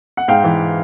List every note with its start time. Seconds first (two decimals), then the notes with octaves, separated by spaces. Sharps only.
0.17 F#5
0.28 G#2 F5 G5
0.44 E3